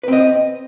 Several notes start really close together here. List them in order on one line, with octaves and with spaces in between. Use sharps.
B4 C4 D#5